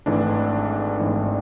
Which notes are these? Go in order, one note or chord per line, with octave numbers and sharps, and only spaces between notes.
G#1 G#2 E3 A3 D4
G#1 G#2 E3 A3 D4